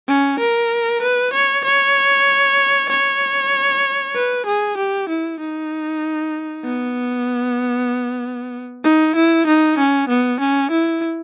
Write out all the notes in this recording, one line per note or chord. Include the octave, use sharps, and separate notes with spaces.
C#4
A#4
B4
C#5
C#5
C#5
B4
G#4
G4
E4
D#4
B3
D#4
E4
D#4
C#4
B3
C#4
E4